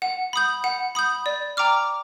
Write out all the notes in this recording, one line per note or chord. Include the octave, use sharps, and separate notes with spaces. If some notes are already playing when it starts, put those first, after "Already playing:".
F#5
B5 D#6 G6
F#5
B5 D#6 G6
D5
G5 A#5 D6 F6